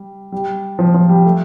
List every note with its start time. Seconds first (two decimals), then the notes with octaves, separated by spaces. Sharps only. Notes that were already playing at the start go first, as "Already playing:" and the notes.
Already playing: G3
0.32 G3
0.79 F3
0.94 F3
1.09 G3
1.25 A3